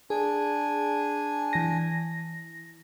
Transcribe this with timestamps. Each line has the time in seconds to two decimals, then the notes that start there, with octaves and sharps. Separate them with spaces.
0.10 D4 G#4 G#5
1.53 E3 A#6